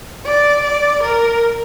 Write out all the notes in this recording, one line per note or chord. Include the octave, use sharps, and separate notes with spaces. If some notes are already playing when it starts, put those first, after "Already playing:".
D5
D5
A#4